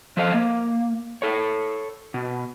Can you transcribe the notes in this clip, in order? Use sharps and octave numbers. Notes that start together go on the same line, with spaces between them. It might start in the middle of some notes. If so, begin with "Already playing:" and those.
F3 A4 C5 D#5 F5
A#3
A4 C#5
B2